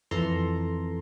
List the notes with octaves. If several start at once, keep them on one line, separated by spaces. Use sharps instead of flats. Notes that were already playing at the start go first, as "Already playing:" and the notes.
F2 E3 A4 A#5 C6